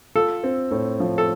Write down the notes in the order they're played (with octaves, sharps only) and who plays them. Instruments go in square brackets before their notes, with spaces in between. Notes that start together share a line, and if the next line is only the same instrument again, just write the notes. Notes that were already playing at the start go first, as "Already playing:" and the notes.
[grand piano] F4 [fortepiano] A4
[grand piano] C4
A2
F3
[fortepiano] A4